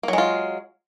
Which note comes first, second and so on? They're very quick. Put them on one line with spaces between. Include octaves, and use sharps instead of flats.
A#3 F#3 G#3 F4